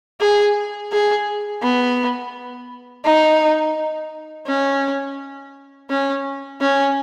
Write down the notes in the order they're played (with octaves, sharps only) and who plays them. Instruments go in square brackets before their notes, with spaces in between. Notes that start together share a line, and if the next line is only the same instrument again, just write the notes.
[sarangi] G#4
G#4
B3
D#4
C#4
C#4
C#4